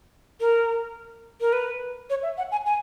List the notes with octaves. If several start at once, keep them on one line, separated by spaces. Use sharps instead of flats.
A#4
A#4
B4
C#5
E5
F#5
G#5
G#5